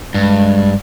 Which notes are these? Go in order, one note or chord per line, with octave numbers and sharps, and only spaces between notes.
G2 G#3